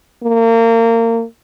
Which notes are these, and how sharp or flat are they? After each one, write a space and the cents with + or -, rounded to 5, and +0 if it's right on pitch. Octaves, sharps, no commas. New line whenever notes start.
A#3 -30